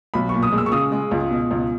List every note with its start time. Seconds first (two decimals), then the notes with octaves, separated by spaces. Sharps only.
0.14 B1 B5
0.29 A#2 C#6
0.43 D#6
0.52 G#3
0.58 E6
0.66 C#6
0.72 C#3 D#6
0.92 G#3
1.11 C#2
1.31 B2
1.51 C#2